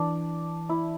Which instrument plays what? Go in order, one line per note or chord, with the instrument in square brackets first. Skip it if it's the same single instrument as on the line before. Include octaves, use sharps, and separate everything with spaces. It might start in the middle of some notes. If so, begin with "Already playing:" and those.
Already playing: [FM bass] E3 [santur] D4
[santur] E4